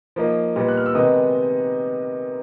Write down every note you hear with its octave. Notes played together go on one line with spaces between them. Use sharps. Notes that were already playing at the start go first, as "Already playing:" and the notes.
F3 A#3 D#4
A#2 G3 B3 D#4
F#6
F6
E6
C3 D#3 G#3 B3 D#4 D#6